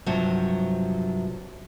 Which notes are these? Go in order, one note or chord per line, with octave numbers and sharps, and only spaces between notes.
G2 C3 F3 F#3